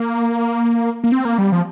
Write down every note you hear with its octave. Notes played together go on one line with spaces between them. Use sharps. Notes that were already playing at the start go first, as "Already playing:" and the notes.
Already playing: A#3
A#3
C4
A#3
G3
F3